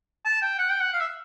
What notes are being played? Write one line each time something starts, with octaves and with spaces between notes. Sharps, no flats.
A5
G5
F#5
G5
F#5
F5
E5